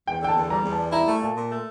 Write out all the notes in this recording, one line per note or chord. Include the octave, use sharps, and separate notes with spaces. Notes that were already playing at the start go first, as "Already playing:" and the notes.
E2 G5
D3 G5
A5
E2
G3 A#5
E2
A5
G3
E4 A#5
A3 A5
A#2 A5
A#2
A3